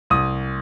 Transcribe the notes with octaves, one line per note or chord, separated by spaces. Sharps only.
C2 D#6